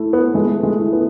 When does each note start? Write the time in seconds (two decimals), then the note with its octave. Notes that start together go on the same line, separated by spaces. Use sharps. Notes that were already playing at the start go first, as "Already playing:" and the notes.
Already playing: A3 E4
0.13 B3
0.34 G#3 A3
0.63 G#3
0.78 E4
0.93 B3